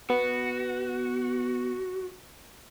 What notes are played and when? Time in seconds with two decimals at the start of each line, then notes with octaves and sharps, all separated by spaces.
0.10 B3 F#4